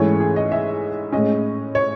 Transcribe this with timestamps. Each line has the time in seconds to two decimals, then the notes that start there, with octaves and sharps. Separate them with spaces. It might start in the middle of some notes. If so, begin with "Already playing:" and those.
Already playing: G#2 E3 A3 C#4 E4 C#5
0.20 G#4
0.36 D#5
0.52 E5
1.12 A2 G#3 C#4 D#5
1.75 C#5